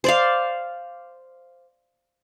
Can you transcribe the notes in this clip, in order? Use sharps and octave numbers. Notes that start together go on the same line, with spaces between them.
C5 D5 F5